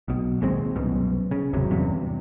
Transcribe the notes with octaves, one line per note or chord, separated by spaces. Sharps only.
B1 B2
A#1 D#2 G#3 C4
C2 F#2 B2
C#3
G#1 E2 C3 F#3
E2 G2 C3